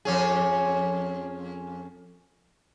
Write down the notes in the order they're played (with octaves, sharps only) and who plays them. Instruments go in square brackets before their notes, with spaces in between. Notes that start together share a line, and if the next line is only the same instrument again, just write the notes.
[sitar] F2 C#4 G#4